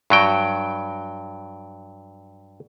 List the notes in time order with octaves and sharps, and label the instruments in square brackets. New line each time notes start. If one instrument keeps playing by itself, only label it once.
[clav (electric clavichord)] G2 F#3 G5